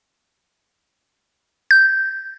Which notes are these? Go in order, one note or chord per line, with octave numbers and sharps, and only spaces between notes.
G6